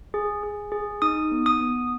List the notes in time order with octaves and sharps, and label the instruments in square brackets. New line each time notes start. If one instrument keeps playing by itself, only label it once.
[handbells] G#4
G#4
G#4
D#4 D#6
B3
D#6
B3